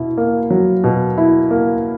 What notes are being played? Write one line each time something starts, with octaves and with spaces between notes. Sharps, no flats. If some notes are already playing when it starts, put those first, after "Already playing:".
Already playing: B2 E4
A#3
F#3
B2
E4
A#3